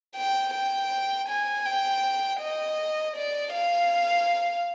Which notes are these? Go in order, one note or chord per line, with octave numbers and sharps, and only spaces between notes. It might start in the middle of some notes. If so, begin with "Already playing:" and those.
G5
G5
G#5
G5
D#5
D5
F5